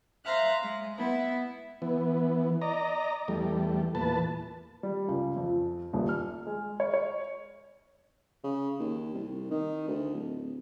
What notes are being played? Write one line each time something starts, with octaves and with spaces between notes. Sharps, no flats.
C5 E5 F5 A#5 F#6
G#3
B3 E4
E3 B3
D5 D#5 A#5
E2 G3 A3
E2 A#2 B4 A5
G3
C#2
F2
D#1
F6
G#3
C#5
C#5
C#3
D#2
C2
D#3
D2
D1